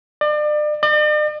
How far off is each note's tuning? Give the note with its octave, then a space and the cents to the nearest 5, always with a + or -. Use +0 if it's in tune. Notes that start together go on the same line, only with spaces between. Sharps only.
D5 +35
D5 +45